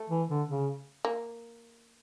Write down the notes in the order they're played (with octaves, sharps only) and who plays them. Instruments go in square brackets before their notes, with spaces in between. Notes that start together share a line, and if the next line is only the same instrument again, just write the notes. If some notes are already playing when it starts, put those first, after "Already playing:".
Already playing: [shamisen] A3
[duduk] E3
D3
C#3
[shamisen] A#3